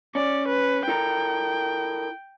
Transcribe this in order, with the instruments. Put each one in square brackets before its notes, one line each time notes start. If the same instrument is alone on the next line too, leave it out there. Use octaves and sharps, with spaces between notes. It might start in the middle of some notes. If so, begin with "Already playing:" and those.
[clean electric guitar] C#4 [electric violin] D5
[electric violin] B4
[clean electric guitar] E4 A4 A#4 [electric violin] G5